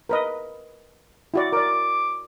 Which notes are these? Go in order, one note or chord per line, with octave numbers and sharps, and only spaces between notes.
A#4 B4 D#5
E4 F#4 D5
A#4 D5 D6